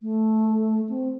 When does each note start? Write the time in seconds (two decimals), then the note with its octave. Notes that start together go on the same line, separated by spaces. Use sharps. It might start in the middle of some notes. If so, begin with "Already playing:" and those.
0.02 A3
0.89 C4